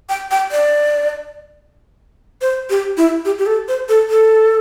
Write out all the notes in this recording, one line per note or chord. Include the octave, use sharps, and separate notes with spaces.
G5
G5
D5
C5
G4
E4
G4
G4
A4
C5
A4
A4